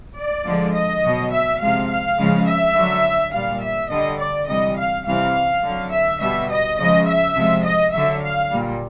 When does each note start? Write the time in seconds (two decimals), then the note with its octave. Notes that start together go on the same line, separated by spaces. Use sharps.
0.16 D5
0.45 D3 F3 G#3
0.74 D#5
1.03 B2 F#3
1.32 E5
1.60 C3 F3 G#3 F5
1.89 F5
2.18 C#3 F3 G#3
2.46 E5
2.75 D3 F#3
3.33 A#2 G3 F5
3.62 E5
3.90 D3 G3 D#5
4.19 D5
4.48 C3 E3 G3 D#5
4.77 F5
5.05 C3 E3 G3 F5
5.63 D3 F#3
5.92 E5
6.20 B2 G3 E5
6.49 D#5
6.78 C#3 F3 G#3 D#5
7.07 E5
7.35 C3 F3 G#3
7.64 D#5
7.93 D3 F#3 E5
8.22 F5
8.51 A#2 G3